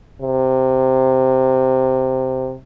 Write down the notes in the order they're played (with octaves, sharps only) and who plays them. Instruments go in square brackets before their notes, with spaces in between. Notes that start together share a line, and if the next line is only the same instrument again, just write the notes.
[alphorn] C3